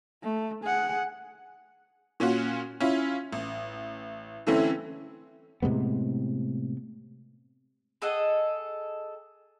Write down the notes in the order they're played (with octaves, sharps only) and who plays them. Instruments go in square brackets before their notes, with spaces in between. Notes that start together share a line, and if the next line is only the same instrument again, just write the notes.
[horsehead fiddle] A3
G#4 F#5
[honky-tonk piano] A#2 C#4 F4 F#4
C#4 E4 F4
A1
D3 E3 A3 C4 C#4 E4
[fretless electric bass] A2 C3 G#3 B3
[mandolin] G#4 A4 D#5 F#5